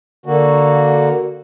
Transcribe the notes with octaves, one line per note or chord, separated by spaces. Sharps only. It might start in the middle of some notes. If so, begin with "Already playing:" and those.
D3 A#3 F#4